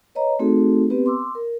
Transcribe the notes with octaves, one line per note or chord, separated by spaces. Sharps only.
B4 C#5 D#5 A#5
A3 C4 D#4 F#4 G#4 A4
B3 C4 G4 B4
C6 D6 E6
A#4